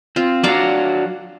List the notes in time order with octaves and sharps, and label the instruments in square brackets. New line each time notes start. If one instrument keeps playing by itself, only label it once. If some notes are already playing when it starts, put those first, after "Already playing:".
[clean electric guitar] C4 [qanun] F4
[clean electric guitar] F#3 D4 F#4 [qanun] D5 F5 A#5